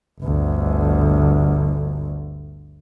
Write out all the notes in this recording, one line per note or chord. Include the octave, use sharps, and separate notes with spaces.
G1 D2